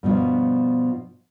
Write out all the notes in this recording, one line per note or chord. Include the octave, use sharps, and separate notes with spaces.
G2 B2 F3